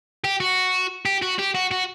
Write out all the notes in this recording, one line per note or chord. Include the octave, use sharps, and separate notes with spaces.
G4
F#4
G4
F#4
G4
F#4
F#4